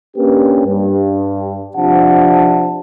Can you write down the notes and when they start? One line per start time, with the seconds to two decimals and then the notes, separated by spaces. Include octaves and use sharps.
0.17 A#3 C#4 D4 G4 B4
0.66 G2
1.77 C3 F3 D4 F#5 A5